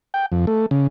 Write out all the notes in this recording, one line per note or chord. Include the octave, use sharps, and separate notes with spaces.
G5
F2
A3
C#3